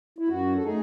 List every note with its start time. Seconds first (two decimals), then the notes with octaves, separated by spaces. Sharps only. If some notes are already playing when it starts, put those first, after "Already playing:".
0.19 E4
0.28 F#2 F#4
0.56 A4
0.64 A3 D#4 G#4